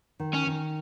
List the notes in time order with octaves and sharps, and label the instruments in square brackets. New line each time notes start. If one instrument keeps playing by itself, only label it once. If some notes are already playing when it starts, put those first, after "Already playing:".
[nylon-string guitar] D#3
[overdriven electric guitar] C#4
[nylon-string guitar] D#3